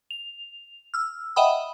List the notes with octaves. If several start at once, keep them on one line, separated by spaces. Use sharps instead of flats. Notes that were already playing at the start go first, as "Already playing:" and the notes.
F7
E6 F6
D#5 E5 F#5 G5 B5 D#6